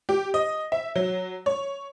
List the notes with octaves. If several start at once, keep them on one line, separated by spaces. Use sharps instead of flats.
G4
D#5
E5
F#3
C#5